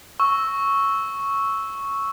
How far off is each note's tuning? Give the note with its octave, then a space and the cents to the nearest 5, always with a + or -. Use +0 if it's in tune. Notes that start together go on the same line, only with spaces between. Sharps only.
C#6 +0 E6 -5